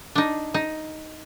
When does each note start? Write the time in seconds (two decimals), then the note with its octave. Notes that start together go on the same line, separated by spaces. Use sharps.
0.15 D4 D#4
0.54 D#4